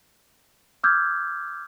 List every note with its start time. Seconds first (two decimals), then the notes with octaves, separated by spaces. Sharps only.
0.84 D6 E6 F6 G6 G#6